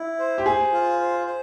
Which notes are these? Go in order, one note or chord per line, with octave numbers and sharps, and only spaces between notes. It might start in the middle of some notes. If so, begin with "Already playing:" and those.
Already playing: E4
C5
G4
G#4 C5
F4
C5
C5